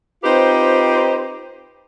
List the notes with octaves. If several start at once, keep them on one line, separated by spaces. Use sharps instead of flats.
C4 D#4 F4 G4 B4 C5